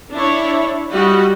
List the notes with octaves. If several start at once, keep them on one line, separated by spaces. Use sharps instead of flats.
D4 E4 C#5
G3 F#4 D#5